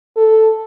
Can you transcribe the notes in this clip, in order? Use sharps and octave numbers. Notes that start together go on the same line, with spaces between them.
A4